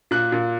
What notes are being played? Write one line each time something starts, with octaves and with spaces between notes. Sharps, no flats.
A#2 F#6
A#2